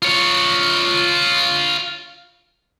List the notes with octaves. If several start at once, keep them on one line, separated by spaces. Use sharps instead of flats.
F4 C#5